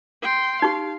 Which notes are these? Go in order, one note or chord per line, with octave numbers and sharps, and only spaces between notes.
G5 C6
D#4 G4 F5